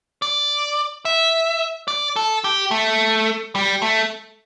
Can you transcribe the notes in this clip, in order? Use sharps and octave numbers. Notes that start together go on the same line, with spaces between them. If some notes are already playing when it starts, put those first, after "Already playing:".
D5
E5
D5
A4
G4
A3
G3
A3